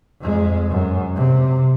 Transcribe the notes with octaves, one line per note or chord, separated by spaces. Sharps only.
F2 G#3
F#2
C3